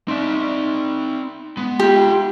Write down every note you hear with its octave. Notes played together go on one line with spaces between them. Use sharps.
C4 D#4 D5 E5
G#3 B3
F4 G4 E5